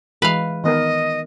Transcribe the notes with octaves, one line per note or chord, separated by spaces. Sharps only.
E3 G#3 B4 F5
D#3 B3 A#4 D#5